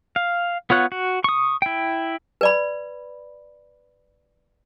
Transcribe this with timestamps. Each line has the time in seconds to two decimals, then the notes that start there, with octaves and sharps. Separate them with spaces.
0.16 F5
0.70 B3 F4 C#5 F#5
0.92 F#4
1.24 C#6 D#6
1.62 E4 G5
2.41 B4 D5 B5